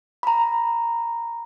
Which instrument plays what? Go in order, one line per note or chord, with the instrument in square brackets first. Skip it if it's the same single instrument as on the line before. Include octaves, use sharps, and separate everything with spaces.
[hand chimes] A#5 B5